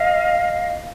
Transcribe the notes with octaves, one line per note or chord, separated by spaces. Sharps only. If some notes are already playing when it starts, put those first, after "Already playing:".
Already playing: D#5 F5